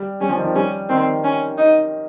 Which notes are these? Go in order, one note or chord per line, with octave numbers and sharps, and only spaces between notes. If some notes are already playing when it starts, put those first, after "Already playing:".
Already playing: G3
G3 C#4
F3
D#3
F3
G3 C#4
D#3 C4
C#4
D#4